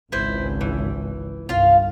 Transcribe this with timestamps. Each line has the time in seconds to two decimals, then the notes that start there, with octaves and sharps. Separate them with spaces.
0.12 G#1 C#2 E4 B4 C5
0.61 E3
1.49 G1 C2 F4 F5